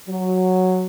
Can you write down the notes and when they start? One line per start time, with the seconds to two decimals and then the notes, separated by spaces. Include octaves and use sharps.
0.09 F#3